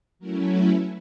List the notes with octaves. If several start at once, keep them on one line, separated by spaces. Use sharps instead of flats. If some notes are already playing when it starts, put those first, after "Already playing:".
F#3 A3 C#4 E4 A#4
B4